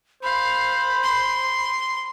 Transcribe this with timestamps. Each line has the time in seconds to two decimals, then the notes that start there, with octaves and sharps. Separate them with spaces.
0.23 C5 F5 B5
1.03 C6